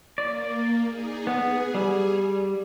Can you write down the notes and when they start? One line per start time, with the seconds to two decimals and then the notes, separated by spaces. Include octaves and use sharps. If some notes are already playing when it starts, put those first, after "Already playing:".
0.18 A#3 D5
0.83 D#4 G#4
1.27 B3 G#4
1.74 G3